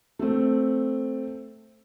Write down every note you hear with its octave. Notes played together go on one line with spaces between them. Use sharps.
A3 C4